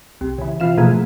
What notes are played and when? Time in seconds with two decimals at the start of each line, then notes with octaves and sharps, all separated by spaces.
0.21 C2
0.39 C#3 E3
0.60 C3 E3 F4 F5 E7
0.78 B2 E3 F3 A3 A#3 G#4